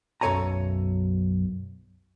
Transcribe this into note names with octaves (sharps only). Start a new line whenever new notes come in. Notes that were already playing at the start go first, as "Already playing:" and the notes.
B1 F#2 A4 C#5 G#5 A#5